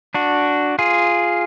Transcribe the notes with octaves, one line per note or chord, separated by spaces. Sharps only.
D4 F#4
F4 G#4